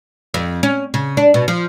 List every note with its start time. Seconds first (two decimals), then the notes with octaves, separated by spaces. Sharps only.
0.34 F2
0.63 C#4
0.94 C#3
1.17 D4
1.34 B2
1.48 F3